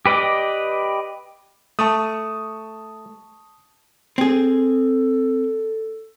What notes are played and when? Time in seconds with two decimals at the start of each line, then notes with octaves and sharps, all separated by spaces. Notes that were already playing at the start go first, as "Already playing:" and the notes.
0.06 G4 B4 D5 D#5 D6
1.79 A3 A5 C#6 D#6
4.18 C4 G#4 A4